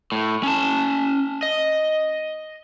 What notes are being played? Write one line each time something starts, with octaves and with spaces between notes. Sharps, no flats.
A2
C#4 A5
D#5